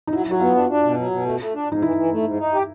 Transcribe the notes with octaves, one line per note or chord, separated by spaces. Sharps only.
D#4
F#3 E4
F#3 F#4
B3 F4
D4
D4
B2
F#3
B2
A3
A3
D4
G#2 D#4
E3 E4
E3
A3
G#2
D#4
G4